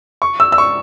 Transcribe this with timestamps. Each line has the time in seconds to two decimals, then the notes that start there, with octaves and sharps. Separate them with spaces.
0.22 C#6
0.40 E6
0.52 E6
0.58 C#6